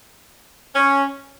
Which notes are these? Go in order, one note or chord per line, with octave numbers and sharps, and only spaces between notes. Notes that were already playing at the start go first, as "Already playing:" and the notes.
C#4